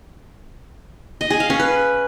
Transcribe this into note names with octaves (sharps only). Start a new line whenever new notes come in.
D#5
G#4
F5
C#4
B4